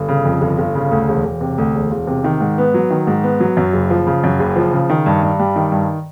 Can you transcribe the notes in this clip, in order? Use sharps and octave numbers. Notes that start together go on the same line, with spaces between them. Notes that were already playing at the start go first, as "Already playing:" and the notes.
Already playing: G1
C#3
F2
G1
G1
C#3
D2
E1
E1
C3
D2
E1
E1
C3
D#3
G#2
B3
F#3
D#3
G#2
B3
F#3
F#2
F#1
F3
C#3
F#2
F#1
F3
C#3
D#3
G2
G2
G3
D#3
G2